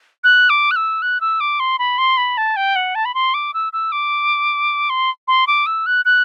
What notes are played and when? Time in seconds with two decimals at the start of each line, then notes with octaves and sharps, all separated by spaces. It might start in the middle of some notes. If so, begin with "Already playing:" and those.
0.24 F#6
0.50 D6
0.71 F#6
0.76 E6
1.02 F#6
1.21 E6
1.40 D6
1.60 C6
1.79 B5
1.98 C6
2.17 B5
2.38 A5
2.56 G5
2.76 F#5
2.95 A5
3.05 B5
3.15 C6
3.34 D6
3.54 E6
3.73 E6
3.92 D6
4.90 C6
5.28 C6
5.47 D6
5.66 E6
5.86 F#6
6.05 F#6